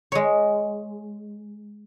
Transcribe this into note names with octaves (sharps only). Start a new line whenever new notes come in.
G#3 C#5